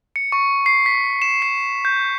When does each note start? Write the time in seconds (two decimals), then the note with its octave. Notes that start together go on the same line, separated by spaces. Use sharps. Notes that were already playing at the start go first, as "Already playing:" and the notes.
0.16 C#7
0.32 C#6
0.66 C7
0.86 B6
1.22 E7
1.42 C7
1.85 G6